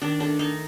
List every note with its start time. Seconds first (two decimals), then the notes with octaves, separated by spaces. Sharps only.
0.02 D#3 D4
0.20 A3 D4
0.39 D#3 D#4